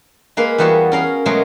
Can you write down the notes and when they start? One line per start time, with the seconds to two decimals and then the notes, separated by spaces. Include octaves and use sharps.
0.37 G#3 A#3 B4 F5
0.58 E2 G3 B3 F#4 G#4 A5
0.92 C#4 A#4 F5
1.26 B2 F#3 G#3 A3 G#4 A#4